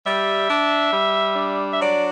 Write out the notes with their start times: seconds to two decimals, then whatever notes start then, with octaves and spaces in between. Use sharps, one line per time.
0.05 G3 E5
0.49 D4
0.92 G3
1.36 D4
1.71 E5
1.80 F#3 D5